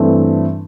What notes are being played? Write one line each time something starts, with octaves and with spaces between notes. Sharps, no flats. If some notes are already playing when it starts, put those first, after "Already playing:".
Already playing: G2 E3 A3 C4